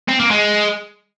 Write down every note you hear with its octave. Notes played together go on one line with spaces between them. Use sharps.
C4
A#3
G#3